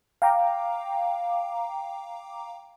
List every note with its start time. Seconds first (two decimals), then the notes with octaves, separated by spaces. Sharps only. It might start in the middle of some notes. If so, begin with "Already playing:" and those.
0.22 F5 G5 A#5 D6